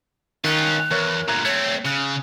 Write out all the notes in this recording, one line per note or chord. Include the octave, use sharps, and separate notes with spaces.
D#3 C#4 F4 F#6
E2 A#4 C#5
D2 A#2 A#5 F#6 G#6
A3 C4 C#5 G#6 C#7
C#3 F#6